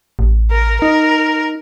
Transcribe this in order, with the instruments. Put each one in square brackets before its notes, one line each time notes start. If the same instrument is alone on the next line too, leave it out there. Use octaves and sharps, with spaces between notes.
[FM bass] A1
[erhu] A#4
[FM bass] D#4 [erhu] A#4